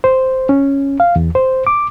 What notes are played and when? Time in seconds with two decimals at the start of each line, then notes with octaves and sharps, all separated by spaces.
0.04 C5
0.49 C#4
1.00 F5
1.16 E2
1.35 C5
1.67 D6